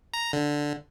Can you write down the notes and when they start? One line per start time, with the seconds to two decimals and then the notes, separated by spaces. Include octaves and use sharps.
0.14 A#5
0.33 D3